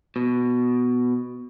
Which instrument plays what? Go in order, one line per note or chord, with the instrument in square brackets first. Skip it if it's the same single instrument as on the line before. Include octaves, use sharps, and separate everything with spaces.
[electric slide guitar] B2